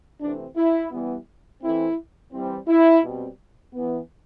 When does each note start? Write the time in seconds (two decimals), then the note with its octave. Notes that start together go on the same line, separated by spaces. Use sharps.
0.21 C3 E3 A3 C4 D4
0.56 E4
0.92 E3 G3 B3
1.62 E3 A3 C4 E4
2.33 E3 G3 C4
2.68 E4
3.04 B2 G3 C4
3.74 E3 B3